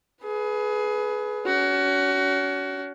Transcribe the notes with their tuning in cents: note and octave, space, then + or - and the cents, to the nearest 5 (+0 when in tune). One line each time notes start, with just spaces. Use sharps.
G#4 +25 B4 +0
C#4 +40 F#4 +25